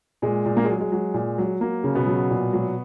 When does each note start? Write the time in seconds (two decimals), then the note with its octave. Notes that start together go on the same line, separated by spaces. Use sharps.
0.22 A#2 G#3
0.46 A#2
0.57 A#3
0.65 G#3
0.69 F#3
0.81 G#3
0.92 F#3
1.14 A#2
1.38 F#3
1.60 F#3 A#3
1.84 C#3
1.95 B2 B3
2.06 F#3
2.31 A#2
2.53 F#3